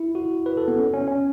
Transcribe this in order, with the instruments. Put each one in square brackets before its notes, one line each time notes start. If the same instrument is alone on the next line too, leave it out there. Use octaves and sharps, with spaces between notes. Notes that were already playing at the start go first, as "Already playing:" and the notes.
Already playing: [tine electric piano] E4
F#4
B4
A4
B3
C#4
C#4
C#4